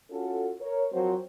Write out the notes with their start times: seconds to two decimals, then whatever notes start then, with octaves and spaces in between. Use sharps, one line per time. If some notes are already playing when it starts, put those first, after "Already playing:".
0.11 C#4 F4 F#4 A4
0.60 A#4 C#5
0.91 F3 F#3 C4 F#4 A#4 C5